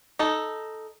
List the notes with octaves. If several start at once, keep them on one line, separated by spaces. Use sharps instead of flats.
D#4 A4